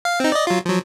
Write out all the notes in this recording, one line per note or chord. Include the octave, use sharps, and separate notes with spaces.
F5
C4 D#4
D5 D#5
F#3 F4
F3 F#3